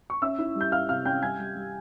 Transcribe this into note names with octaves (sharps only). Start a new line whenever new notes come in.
C#6
C#4 E5 E6
E4
G3
G6
C#4 F5 F6
C3 F5 F6
C#4 G5 G6
G3 G#5 G#6
G3
G3